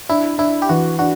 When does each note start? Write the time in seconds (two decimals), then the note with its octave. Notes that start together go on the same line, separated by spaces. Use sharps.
0.09 D4 E4
0.38 D4 E4
0.62 G4
0.69 E3 F#4
0.99 D4 F#4